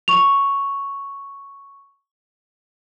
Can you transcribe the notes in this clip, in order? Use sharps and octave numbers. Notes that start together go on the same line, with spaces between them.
C#6 F7